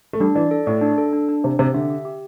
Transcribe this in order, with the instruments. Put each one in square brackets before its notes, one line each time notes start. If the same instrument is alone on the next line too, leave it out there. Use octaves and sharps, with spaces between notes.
[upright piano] A3
[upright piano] G3 [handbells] D4
[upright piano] E3 [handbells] D5
[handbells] A4
[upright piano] A2 [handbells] D5
[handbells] D4
A4
D4
D4
[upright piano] C3 [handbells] G4
[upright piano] C3 [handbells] G4
[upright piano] D3 [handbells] E5
[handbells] G4
G4